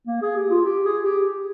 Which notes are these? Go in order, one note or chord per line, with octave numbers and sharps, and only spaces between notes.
A#3
G#4
G4
F4
G4
G#4
G4